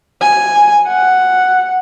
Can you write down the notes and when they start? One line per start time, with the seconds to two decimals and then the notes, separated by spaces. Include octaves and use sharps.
0.22 G#5
0.88 F#5